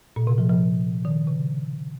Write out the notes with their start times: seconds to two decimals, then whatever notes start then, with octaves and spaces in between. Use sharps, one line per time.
0.16 A#2
0.27 C3
0.38 F3
0.49 F3
1.05 D#3
1.27 C#3